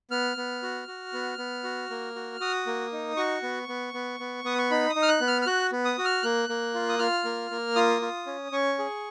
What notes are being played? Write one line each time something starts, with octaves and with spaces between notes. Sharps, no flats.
B3 F6
B3
F#4
F#4
B3
B3
F#4
A#3
F#4
F#4 D#6
A#3
D#4
F#4 C#6
B3
B3
B3
B3
B3 D#6
C#6
D#4 B5
D#6
D#4
F6
F#6
B3
F6
F6
F#4 F#6
B3
D#6
F#4
F6
A#3 F#6
A#3
F4
D#6
F4 F6
A#3
A#3
F4 D#6
F4
C#4
C#4 C#6
G#4